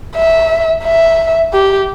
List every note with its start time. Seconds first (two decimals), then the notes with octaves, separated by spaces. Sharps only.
0.16 E5
0.84 E5
1.53 G4